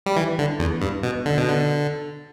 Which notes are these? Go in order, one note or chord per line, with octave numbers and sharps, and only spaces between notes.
G3
E3
D3
E2
G2
B2
D3
B2
D3